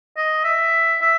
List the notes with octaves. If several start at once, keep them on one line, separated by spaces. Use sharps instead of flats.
D#5
E5
E5